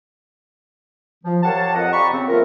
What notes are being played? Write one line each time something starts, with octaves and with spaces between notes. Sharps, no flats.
F3
G4 A#4 C#5 F5 F#5 A5
F2 D#5 F#5
F4 G4 D5 A#5 B5 C#6
C#3 C4
F3 A3 B3 F4 A#4